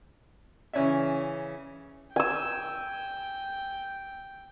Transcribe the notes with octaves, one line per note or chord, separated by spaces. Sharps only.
C#3 E3 C#4 C#5 D5 E5
G5 G#5 E6